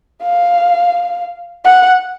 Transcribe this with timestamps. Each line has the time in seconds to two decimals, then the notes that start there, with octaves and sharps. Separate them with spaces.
0.23 F5
1.64 F#5